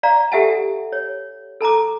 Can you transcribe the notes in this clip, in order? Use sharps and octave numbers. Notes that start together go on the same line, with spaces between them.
D5 F5 A#5
G4 A4 E5 F#5 G#5 A5
C#5
A4 A5 A#5 D6